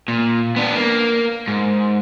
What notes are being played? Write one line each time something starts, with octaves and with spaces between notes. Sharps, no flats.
A#2
B3 D4
A#3
G#2